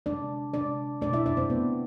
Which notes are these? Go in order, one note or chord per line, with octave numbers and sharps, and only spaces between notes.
C3 G#3 D4 D5
C3 G#3 D4 D5
B2 A3 D4 D5
E4 E5
D4 D5
C4 C5
B2 A3 B3 B4